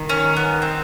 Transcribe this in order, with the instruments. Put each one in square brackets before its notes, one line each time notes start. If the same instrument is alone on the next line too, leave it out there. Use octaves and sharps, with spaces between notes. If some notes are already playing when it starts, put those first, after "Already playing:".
Already playing: [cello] D#3
[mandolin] C#4
B3
C4